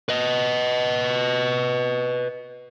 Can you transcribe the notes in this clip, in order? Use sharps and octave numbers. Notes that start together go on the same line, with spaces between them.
B4 D#5